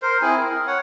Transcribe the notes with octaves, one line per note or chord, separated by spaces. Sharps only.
A#4 C5
C4 E4 G#4 G#5
A#4
C#5 F#5